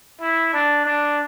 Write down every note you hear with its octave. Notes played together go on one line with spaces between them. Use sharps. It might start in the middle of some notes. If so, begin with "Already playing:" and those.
E4
D4
D4